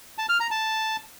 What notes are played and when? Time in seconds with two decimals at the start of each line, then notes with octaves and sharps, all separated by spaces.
0.18 A5
0.29 F6
0.40 A#5
0.51 A5